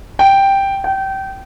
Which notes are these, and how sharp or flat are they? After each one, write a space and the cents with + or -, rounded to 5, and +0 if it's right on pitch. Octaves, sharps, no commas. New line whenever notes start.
G5 +0
G5 -25